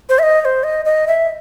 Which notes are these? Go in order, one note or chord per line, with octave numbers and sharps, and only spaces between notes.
C5
E5
D#5
D#5
C5
D#5
D#5
E5